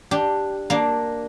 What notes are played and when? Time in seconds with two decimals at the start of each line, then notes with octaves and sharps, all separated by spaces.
0.11 D4 G4
0.70 A#3 D4